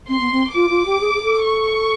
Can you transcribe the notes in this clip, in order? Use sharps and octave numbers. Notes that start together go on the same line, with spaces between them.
C4 C6
B3
C4
F4 D6
F4
G4
G#4
G#4
A4
C#6